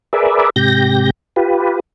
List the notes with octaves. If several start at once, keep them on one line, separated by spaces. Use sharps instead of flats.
G#4 A#4 B4 D5 E5
G#2 C3 G4 G6 A#6
F4 G4 B4